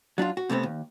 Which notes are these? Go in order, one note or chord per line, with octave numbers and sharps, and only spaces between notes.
F#3 D4 D#4 F4
F#4
C3 A3 B3 C4
D#2